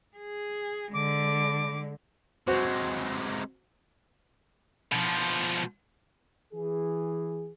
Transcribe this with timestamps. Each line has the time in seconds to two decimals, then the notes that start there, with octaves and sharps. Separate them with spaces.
0.17 G#4
0.94 D3 G#3 D6
2.48 C3 G#3 F#4 C5
4.92 B2 F3
6.53 E3 G#4